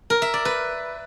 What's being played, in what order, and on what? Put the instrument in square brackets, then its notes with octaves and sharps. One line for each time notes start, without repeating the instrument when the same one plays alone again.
[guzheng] A#4
E5
D5
B4